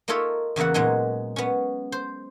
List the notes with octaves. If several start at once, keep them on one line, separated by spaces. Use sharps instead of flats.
A#3 D#4 F4 A4 C#5 E5
E2 C#3 A#3 E5 F#5
A#2 F#3 G#3 B3 D#4
B3 C#4
C5